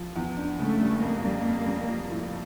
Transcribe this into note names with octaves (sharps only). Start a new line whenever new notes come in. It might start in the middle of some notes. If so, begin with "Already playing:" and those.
Already playing: F3
E2
D4
C#3 A3
G3
F2 A#3
G3
F2
G3
F3
A2